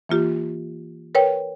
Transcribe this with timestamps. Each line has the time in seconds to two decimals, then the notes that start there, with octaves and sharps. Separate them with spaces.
0.09 E3 A#3 F4 G4
1.15 A#4 B4 C#5 G5